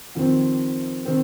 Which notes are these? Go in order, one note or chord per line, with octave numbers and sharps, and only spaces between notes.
F2 D#3 C4
D#3 C4